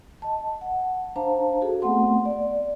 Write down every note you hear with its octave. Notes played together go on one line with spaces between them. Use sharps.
D#5 A5
F#5
D4 C5 F5 A5 A#5
F#4 G#4 A4
A3 B3 C4 F#5 C6
D5